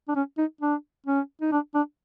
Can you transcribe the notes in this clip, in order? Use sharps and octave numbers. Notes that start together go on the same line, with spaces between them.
D4
C#4
D#4
D4
C#4
D#4
D4
D4